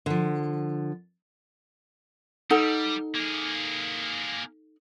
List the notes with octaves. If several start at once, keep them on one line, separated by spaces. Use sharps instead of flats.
D3 F3
G3 D#4 A4 F#5
A#3 G#4